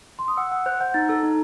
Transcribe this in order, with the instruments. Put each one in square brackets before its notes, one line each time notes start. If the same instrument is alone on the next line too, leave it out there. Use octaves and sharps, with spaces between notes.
[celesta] C6
D#6
[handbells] F#5 [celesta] E6
[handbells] F#5 [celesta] E6
[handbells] C5 [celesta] F#6
[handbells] F#5 [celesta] G6
[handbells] D#4 [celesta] A6
[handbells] A4 [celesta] E6
[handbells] D#4